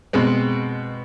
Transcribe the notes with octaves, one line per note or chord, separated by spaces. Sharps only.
B2 G#3 C4